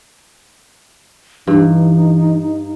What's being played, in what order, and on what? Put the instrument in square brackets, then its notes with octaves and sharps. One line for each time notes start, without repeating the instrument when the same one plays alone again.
[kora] G2 [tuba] E3 [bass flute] D#4